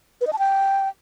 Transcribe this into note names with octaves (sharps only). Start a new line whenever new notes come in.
B4
D#5
A5
G5